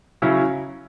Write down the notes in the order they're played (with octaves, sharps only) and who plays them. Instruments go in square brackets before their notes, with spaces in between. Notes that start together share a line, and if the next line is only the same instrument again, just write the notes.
[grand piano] C#3 F#3 C#4 E4